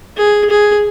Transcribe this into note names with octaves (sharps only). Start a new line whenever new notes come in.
G#4
G#4